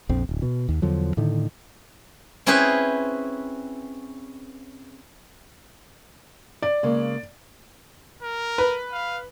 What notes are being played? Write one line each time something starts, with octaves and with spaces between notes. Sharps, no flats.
A#1 F2 C4
D1
B2
D#2
E2 D3 F3 F#3
A2 D3 D#3
C4 C#4 E4 G#4 B4 C5
D5
C#3 G#3 A#3
A#4
B4
F5